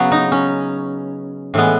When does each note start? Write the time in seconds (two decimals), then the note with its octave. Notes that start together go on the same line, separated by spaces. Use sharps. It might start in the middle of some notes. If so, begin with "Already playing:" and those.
Already playing: C#3 F#3 B3
0.12 D#4
0.32 C#4
1.54 A2 E3 G#3 B3